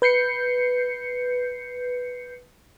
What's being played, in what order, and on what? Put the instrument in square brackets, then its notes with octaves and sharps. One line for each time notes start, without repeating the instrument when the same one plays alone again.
[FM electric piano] B4 G6 C7 C#7